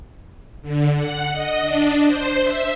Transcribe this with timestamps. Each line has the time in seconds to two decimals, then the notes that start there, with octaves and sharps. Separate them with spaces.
0.62 D3
0.95 F#5
1.32 D#5
1.62 D4
2.07 C5
2.43 E5